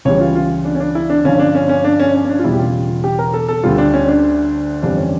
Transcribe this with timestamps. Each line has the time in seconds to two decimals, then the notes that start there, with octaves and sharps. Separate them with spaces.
0.05 C#2 C#3 E3 G3 C#5
0.20 F4
0.35 F4
0.65 D4
0.75 C#4
0.80 D4
0.95 E4
1.10 D4
1.24 G1 G2 F3 C#4
1.39 D4
1.55 C#4
1.69 C#4
1.84 D4
2.00 C#4
2.14 C#4
2.25 C#4
2.29 D4
2.39 F4
2.44 E1 E2 C#3 G3 E4
2.54 G4
2.59 F4
3.04 G4
3.19 A#4
3.34 A4
3.48 A4
3.63 D2 D3 G3 F4
3.78 D4
3.94 C#4
4.08 D4
4.82 G1 F2 E3 G3 D4
4.98 C#4